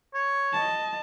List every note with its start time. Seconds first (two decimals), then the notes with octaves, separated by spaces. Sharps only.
0.14 C#5
0.53 D#5 A5